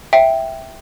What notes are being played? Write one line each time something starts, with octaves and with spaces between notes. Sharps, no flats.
E5 G5